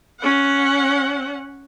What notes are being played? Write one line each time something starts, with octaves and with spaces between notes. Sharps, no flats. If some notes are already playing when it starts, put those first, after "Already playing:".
C#4 F#5